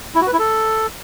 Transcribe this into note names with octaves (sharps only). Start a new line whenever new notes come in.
E4
F#4
B4
E4
A4